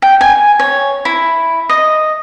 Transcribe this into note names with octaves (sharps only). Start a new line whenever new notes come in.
G5
G#5
C#5
E4
D#5